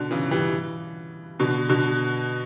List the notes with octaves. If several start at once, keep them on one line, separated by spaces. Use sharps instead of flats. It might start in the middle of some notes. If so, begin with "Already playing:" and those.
Already playing: B2 D3
C#3 E3
E3 G3
B2 D3
B2 D3